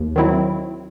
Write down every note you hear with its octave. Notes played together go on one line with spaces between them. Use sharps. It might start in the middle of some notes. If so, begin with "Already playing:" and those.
Already playing: D#2
D#3 F#3 C4 E4